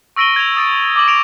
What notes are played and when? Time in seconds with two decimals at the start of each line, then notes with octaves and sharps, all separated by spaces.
0.16 C#6 E6 A#6 D7 D#7 G7
0.36 G#6 F7
0.56 D#6 A6 D7
0.96 D6 F#7
1.08 D7 F7